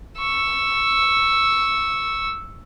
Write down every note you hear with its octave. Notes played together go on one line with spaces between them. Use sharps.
C#6 E6